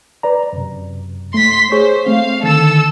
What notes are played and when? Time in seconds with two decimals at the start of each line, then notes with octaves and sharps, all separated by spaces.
0.23 B4 D5 A#5
0.53 F#2 C3
1.34 A3 C6 B6
1.72 G#4 C5 C#5 C#6
2.06 A3 C4 F5
2.43 D3 D#3 A4 E6 A6